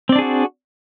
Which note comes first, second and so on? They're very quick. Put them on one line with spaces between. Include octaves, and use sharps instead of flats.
C4 D5 D4 G#4 F#4